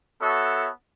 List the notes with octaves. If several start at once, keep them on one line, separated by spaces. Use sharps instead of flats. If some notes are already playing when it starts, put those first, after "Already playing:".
B3 F#4 A4 C#5 E5